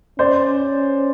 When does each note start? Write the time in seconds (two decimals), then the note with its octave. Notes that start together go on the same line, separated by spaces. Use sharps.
0.19 C#4 C5 D5